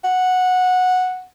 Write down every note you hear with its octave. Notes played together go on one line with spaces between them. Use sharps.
F#5